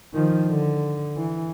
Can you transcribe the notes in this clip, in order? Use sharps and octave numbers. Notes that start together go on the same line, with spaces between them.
D#3 F3
D3
E3